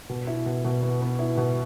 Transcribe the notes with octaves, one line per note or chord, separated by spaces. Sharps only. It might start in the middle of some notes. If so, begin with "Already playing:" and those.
B2
E4
B2
B2
B3
B3
E4
B2